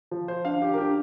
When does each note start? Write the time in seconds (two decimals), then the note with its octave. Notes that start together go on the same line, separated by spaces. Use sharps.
0.11 F3
0.28 C5
0.45 D4 F5
0.62 G4
0.73 A#4
0.78 D4 G4